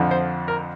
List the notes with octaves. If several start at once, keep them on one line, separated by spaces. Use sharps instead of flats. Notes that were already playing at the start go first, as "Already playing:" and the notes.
Already playing: F2 D3 F3
C5
A#4